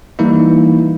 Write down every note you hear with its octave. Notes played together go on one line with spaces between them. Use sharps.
E3 G3 A#3 D#4 E4